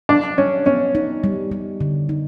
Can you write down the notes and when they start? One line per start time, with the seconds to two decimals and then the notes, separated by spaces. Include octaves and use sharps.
0.09 G3 D4
0.38 G3 C#4
0.66 B3 C#4
0.95 D#4
1.24 G3
1.51 G3
1.81 D3
2.09 D#4